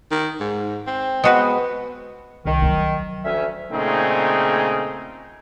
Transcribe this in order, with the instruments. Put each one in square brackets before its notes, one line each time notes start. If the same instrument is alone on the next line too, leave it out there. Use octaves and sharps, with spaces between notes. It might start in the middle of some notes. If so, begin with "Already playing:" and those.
[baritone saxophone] D#3
G#2
C4
[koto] G#3 F#4 B4 [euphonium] B3
[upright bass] C2 [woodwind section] D#3
[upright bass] F3 F#3
[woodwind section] D2 C#4 E5
[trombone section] A#2 C#3 A3 C4 D#4 G#4